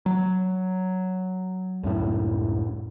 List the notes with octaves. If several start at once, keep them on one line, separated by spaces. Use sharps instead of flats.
F#3
C#2 F#2 A2